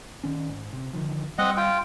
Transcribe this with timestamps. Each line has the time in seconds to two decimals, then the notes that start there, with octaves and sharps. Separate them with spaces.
0.24 D#3 C#4
0.49 G#2
0.73 C3
0.93 D3 D#3 F3
1.38 G3 C4 D#5 F#5
1.57 F4 G5